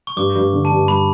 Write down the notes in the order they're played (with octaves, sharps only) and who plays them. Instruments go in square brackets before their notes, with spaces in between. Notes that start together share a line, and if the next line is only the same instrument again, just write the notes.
[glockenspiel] C#6
[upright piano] G2 [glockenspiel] D6
[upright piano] G2
D3
[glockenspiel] A5
[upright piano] G2
[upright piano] G3 [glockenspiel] B5